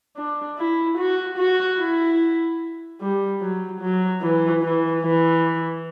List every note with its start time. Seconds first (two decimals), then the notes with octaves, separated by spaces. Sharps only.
0.17 D4
0.58 E4
0.98 F#4
1.38 F#4
1.80 E4
3.01 G3
3.41 F#3
3.80 F#3
4.21 E3
4.62 E3
5.02 E3